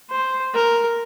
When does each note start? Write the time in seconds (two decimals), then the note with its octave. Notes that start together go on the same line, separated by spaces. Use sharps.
0.10 C5
0.54 A#4